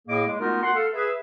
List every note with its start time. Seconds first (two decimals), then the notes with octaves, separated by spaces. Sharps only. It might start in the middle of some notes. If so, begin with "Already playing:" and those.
0.08 A2 A#3 G#4 D#5 D6
0.27 G#3
0.40 A3 B3 D#4 F4 F#4 A#4
0.63 F#5 C6
0.74 A4 F5
0.93 G#4 B4 E5